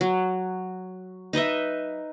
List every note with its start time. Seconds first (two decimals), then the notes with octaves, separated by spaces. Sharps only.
0.01 F#3
1.33 D#4 B4 D#5 E5